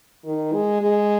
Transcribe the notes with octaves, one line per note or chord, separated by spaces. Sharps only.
D#3
G#3
G#3